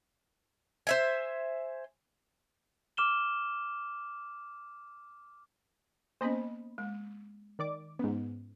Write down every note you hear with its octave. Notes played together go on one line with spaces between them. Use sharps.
C5 E5 G#5
D6 F6 E7 G7
A#3 B3 C#4 C5 D#5 B5
G#3
D#3 D5 D6
G#2 B3 C#4